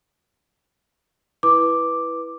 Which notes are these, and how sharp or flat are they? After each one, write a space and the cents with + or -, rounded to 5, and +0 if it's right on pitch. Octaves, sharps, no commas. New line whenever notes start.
E4 +0 B4 -10 D6 +0